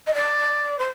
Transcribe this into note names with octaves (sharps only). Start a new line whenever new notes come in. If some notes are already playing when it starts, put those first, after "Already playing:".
D#5
D5
C5